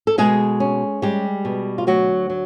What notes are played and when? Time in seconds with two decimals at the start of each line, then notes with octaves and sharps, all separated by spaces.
0.07 A4
0.18 B2 G#3 G#4
0.60 C#4
1.02 G3 G#3 G4
1.45 B2
1.78 F4
1.87 D2 F#3 F#4
2.30 F#3